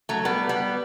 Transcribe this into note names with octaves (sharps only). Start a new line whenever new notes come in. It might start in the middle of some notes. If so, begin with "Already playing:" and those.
F#3 A3
G3 B3
G3 B3